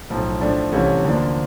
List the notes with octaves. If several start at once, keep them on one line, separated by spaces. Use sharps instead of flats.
B1 A2 F3
A2 F3 A3 D4
C2 C3 E3 A3 C#4
D2 D3 F3 A#3 D4